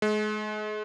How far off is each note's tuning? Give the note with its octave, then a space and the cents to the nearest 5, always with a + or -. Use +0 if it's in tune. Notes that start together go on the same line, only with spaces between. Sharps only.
G#3 +35